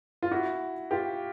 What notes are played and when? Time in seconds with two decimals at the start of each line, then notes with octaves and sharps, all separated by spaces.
0.23 F4
0.31 E4 F#4
0.91 F4 G4